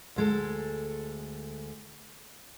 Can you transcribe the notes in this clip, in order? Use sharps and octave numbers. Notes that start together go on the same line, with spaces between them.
D2 G#3 A4